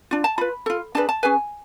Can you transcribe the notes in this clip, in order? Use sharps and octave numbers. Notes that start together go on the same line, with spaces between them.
D4 F4
A5
F4 B4 B5
F4 A4
D4 G#4 B4 A5
A5
C#4 G#4 B4 G#5